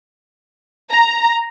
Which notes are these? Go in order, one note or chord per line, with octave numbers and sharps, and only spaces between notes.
A#5